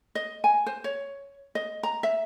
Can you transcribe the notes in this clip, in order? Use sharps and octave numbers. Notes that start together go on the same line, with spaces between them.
D#5
G#5
C5
C#5
D#5
A#5
E5